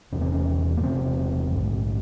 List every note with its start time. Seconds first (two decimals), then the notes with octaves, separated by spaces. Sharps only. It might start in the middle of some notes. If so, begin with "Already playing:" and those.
0.12 E1 E2 C3 C#4
0.21 C4
0.32 C#4
0.77 A#3
0.83 E1 E2 C3 C4
1.55 A#1 G#2